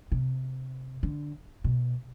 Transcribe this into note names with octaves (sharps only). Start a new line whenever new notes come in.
C3
D3
B2